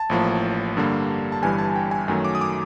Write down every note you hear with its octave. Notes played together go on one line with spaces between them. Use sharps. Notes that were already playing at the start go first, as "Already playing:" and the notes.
Already playing: A5
A1 A2 F3 A#3
G2 D3 G3 A#3
A5
G1 G2 E3 G3 G#5
A5
G5
G#5
F#2 D#3 F#3 A3 G#5
D6
D#6
D6